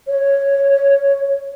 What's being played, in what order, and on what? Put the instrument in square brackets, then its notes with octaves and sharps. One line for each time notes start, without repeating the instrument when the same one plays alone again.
[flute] C#5